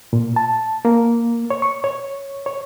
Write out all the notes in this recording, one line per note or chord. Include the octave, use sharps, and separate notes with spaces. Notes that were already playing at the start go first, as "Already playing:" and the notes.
A#2
A5
A#3
C#5
C#6
C#5
C#5